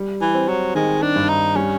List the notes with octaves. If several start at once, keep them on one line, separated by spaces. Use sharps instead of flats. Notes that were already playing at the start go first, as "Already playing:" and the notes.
Already playing: G3
E3
C4
F#3
D#3 G#3
D4
G2
D#4
G3 C#4